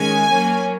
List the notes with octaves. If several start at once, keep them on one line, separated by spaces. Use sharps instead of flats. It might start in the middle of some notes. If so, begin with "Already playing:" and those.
Already playing: D#3 G#3 C#4 G#5
F#3 A#3 C#4